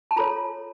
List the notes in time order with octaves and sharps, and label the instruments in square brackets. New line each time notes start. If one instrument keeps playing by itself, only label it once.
[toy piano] A5
F4 A4 C#5 A#5